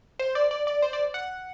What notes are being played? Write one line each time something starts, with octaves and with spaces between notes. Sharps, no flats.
C5
D5
D5
D5
C5
D5
F#5